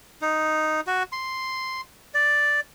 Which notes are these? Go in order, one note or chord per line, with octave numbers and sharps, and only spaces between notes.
D#4
F#4
C6
D5